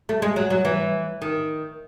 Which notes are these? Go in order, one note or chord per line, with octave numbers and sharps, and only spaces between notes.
A3
G#3
F#3
F#3
E3
D#3